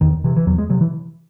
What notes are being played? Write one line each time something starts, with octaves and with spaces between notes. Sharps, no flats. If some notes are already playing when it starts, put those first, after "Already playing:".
E2 D#3
C3 E3
E3
E2 F#3
G#3
C3 F#3
E3